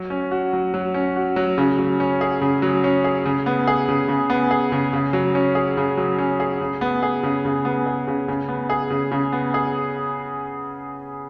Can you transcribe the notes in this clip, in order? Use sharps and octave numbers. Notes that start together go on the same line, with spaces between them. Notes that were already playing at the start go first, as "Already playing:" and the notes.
Already playing: F#3
C#4
F#4
F#3
F#3
C#4
F#4
F#3
C#3
F#3
C#4
G#4
C#3
F#3
C#4
G#4
C#3
B3
G#4
C#3
C#3
B3
G#4
C#3
C#3
F#3
C#4
G#4
C#3
F#3
C#4
G#4
C#3
B3
G#4
C#3
C#3
B3
G#4
C#3
C#3
B3
G#4
C#3
C#3
B3
G#4